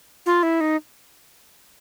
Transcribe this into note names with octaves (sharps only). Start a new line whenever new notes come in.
F4
E4
D#4